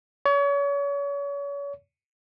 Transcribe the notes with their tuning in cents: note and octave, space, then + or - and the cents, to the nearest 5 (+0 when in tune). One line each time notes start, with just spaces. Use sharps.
C#5 +35